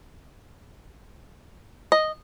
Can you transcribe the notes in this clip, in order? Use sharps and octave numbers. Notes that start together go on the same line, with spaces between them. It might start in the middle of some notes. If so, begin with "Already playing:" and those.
D#5